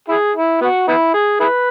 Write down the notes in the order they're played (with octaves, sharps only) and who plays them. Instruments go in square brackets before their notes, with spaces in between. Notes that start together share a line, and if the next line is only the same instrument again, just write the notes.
[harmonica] E4 G#4
E4
B3 F#4
B3 E4
G#4
E4 G#4 B4